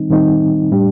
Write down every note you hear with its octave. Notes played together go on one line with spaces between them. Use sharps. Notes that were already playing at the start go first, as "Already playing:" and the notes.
Already playing: D#3 G3 C4 D#4
D#3 G3 C4 D#4
A2 G3 D4 G4